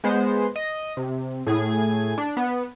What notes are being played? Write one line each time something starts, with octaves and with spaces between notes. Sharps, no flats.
G#3 B3 C5
D#5
C3
A2 G#4 G#6
D4
B3